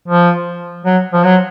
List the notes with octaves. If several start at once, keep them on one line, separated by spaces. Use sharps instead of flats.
F3
F#3
F3
F#3